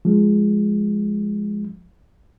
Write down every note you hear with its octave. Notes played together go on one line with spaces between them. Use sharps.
F3 G#3